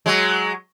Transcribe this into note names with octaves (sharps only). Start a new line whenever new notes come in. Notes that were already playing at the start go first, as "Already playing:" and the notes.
F#3 G#3